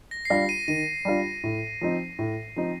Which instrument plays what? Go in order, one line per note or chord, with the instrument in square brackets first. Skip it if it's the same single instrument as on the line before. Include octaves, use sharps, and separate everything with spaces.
[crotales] A#6
C7
[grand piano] G3 D4 F4 [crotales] A#6
[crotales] D#7
[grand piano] D#3 [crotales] D#7
[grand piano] G3 D4 F4
A2
F3 C4 D#4
A2
F3 C4 D#4